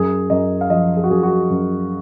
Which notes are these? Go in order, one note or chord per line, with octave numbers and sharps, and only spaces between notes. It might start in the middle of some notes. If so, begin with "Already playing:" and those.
Already playing: F#2 G#4
F#2 D#5
F5
F3 D#5
G#4
F#4
F#2 G#4
F#4
F#2